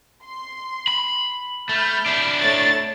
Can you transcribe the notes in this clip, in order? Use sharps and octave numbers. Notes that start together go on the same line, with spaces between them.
C6
B5
A3 B5 F6 G6
D4 E4
A3 C#5 A6